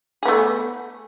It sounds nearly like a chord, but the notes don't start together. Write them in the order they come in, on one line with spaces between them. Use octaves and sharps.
G#4 B3 A3